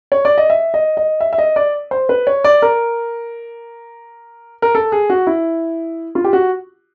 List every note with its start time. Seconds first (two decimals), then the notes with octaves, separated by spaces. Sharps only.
0.12 C#5
0.25 D5
0.38 D#5
0.50 E5
0.74 D#5
0.97 D#5
1.21 E5
1.33 E5
1.38 D#5
1.56 D5
1.91 C5
2.09 B4
2.27 C#5
2.44 D5
2.62 A#4
4.62 A#4
4.75 A4
4.92 G#4
5.10 F#4
5.27 E4
6.15 F4
6.24 G4
6.33 F#4